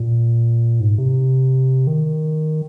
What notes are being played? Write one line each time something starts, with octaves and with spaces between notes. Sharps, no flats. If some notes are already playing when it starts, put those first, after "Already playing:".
Already playing: A#2
G#2
C3
D#3